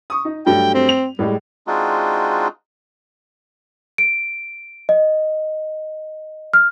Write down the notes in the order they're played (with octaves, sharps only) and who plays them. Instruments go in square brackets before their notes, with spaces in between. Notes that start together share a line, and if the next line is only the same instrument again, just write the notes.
[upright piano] C#6 D#6
D#4
[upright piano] G2 F#3 A3 [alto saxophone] G5
[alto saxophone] C4
[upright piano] F7
[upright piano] A2 G#3 [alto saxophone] G3
[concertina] G#3 C4 D4 D#4 F4 F#4
[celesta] D7
D#5
F6